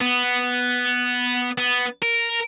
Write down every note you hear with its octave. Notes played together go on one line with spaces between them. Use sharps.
B3
B3
A#4